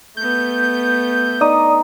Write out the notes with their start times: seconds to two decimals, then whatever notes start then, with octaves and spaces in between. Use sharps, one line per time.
0.17 A3 B3 G6
1.41 D#4 D5 D#6